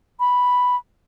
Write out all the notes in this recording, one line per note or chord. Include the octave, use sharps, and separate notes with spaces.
B5